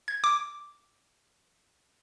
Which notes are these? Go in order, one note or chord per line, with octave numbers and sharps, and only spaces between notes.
G#6
D6